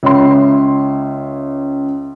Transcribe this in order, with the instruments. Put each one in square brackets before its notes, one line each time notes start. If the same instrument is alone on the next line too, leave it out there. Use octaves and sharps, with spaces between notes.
[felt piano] C#2 C#5 E5 C6